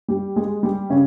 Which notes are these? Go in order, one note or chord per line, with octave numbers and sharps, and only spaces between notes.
G3 G4
G#3 G#4
G3 G4
C#3 C#4